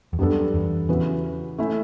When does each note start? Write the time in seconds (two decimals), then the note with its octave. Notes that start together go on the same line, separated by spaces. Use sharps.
0.13 E2
0.19 F#2 G3 B3 D4 A4
0.54 E2
0.89 C#3 E3 B3 F#4 B4
1.58 A3 C#4 E4